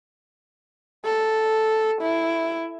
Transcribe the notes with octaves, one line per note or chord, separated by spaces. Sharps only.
A4
E4